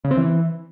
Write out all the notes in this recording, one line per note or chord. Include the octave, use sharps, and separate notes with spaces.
C#3
C4
E3